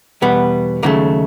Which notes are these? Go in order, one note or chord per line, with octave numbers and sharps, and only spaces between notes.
E2 B2 G3 B3
D#2 C#3 F#3 A3 A#3